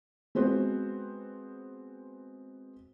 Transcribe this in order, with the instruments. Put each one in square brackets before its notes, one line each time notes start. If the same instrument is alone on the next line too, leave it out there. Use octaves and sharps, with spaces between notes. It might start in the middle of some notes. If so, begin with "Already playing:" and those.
[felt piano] G#3 B3 C4 F#4 C5